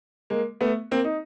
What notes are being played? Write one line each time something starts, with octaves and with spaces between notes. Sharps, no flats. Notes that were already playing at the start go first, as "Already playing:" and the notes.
G#3 A#3
A3 B3
A#3 C4
D#4